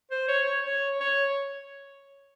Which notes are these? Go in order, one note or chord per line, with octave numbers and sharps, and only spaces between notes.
C5
C#5
C#5
C#5
C#5